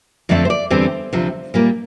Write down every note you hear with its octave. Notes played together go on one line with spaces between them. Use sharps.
F2 D3 A3 C4 D5
C5
D5
E2 D3 G3 C4 C5
D2 C3 F3
A#2 G3 A#3